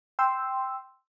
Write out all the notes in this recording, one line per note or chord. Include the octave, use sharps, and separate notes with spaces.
G5 C6 E6